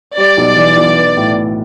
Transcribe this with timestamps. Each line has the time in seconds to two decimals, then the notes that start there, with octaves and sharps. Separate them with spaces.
0.17 G3 D5
0.37 B1
0.56 E3
0.77 B1
0.96 B4
1.17 A2
1.36 A2